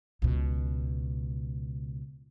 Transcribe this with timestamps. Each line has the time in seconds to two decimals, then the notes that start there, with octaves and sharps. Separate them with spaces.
0.22 C#2 B2